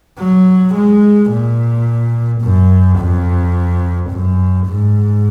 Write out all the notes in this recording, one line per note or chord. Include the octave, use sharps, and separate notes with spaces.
F#3
G#3
A#2
F#2
F2
F#2
G#2